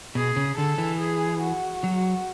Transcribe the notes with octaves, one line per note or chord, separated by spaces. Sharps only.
B2 G#4
C#3
D3 A4
E3
G#4
F#4
F#3